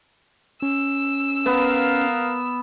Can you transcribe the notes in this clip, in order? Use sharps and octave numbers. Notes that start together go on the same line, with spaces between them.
C#4 E6
B3 A#4 B4 F5